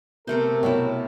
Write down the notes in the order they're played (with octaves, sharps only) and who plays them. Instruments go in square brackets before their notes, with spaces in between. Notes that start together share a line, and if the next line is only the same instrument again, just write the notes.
[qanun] C3 A3 C5 [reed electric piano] B3 E5 [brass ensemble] A#4
[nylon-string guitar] B2 B3 E4 [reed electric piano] C#5 G5